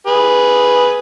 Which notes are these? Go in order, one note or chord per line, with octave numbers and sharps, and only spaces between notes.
G#4 B4